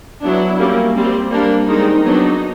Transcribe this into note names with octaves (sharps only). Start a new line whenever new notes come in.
F#3 B3 D4 E4
G3 A#3 C#4
G3 C4
G3 A#3 D4
D#3 G#3 C4 D#4
F#3 B3 D4 D#4